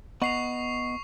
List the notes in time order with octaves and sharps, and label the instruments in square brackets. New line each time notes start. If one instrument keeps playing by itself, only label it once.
[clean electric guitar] B3 D#5 F#5 [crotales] C#6 C7 F7